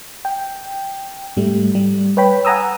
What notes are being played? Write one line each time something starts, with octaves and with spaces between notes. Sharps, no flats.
G5
G#2 G3 A3
G3
B4 C#5 G5 B5
F#5 G#5 A#5 D#6 E6